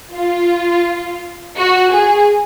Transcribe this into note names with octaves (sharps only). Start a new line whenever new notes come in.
F4
F#4
G#4